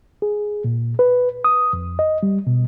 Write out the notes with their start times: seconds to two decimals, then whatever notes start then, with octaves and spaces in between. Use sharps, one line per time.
0.22 G#4
0.64 A#2
0.99 B4
1.45 D#6
1.73 F2
1.99 D#5
2.23 G3
2.47 B2